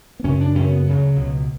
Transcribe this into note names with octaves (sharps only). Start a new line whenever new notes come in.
B3
F#2 C#3 C#4
D4
F#2 C#3 C#4
B3
D2 C#3 F#3
C#2 B2